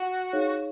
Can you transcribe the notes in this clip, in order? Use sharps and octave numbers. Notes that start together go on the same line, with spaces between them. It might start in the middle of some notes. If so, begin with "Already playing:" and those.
Already playing: F#4
D#4 G#4 C#5 F5